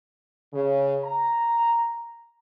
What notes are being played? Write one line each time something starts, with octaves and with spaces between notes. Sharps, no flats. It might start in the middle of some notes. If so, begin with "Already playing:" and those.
C#3
A#5